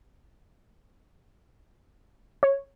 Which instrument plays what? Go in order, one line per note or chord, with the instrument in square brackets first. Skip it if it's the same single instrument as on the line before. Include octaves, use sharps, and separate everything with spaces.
[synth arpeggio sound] C#5